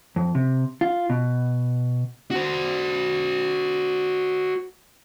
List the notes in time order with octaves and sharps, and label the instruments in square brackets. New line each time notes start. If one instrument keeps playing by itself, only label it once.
[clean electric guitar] F2
C3
F4
B2
[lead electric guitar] F#4 C5